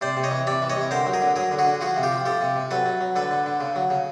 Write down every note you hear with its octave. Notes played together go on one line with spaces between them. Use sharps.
C3 C5 D5
C3
C#5 D#5
E3
C3 D5 E5
E3
C#5 D#5
C3
D3 A#4 C5
F#3
G#4 A#4
D3
F#3 G#4 A#4
D3
F#4 G#4
D3
F3 F#4 G#4
C3
F4 G4
F3
F3 G4 A4
C3
C3
F#3 A4 B4
F#3
F#3
D3 A4 B4
D3
D3
C#3
F#3
C#3